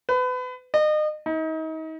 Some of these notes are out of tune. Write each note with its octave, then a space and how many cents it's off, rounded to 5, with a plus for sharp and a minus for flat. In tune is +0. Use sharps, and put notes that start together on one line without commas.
B4 +30
D#5 -35
D#4 +35